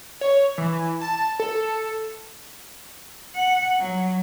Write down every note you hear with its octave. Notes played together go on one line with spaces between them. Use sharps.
C#5
E3
A5
A4
F#5
F#3